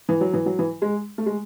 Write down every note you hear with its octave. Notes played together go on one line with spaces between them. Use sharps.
E3
F#3
E3
F#3
E3
G#3
A3
G#3